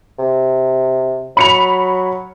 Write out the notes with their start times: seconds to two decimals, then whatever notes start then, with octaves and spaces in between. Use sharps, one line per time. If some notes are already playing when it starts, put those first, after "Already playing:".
0.19 C3
1.37 F#3 B5 C#7 F7